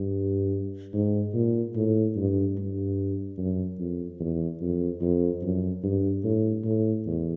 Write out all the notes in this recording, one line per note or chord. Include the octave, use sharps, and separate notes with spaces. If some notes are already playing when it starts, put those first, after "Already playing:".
Already playing: G2
G#2
A#2
A2
G2
G2
F#2
F2
E2
F2
F2
F#2
G2
A2
A2
E2